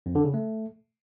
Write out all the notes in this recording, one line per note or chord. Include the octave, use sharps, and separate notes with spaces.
F2
D3
C#3
A3